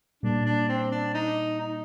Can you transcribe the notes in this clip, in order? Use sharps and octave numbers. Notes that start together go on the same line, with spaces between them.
A#2 G3 A#3 D4
D4
C4
D4
D#4
D#4